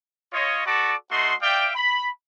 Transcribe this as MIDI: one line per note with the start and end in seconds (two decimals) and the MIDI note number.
0.33 0.64 65
0.33 0.64 73
0.33 0.64 75
0.66 0.95 66
0.66 0.95 69
0.66 0.95 74
0.66 0.95 81
0.66 0.95 83
0.66 0.95 86
1.11 1.34 57
1.11 1.34 63
1.11 1.34 66
1.11 1.34 75
1.11 1.34 84
1.42 1.71 74
1.42 1.71 76
1.42 1.71 77
1.42 1.71 79
1.75 2.09 83